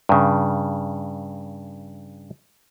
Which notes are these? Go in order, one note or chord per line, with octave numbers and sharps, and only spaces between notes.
G2 C#3